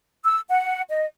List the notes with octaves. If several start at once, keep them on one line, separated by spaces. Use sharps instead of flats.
E6
F#5
D#5